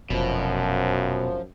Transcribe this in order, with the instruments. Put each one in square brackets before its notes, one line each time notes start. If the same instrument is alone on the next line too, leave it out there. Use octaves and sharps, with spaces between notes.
[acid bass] F1 [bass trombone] F#2 [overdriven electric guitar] B2 [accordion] F3